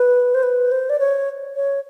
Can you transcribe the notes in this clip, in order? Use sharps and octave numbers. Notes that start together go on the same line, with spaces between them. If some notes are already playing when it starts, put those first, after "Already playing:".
Already playing: B4
C5
B4
C5
D5
C#5
C#5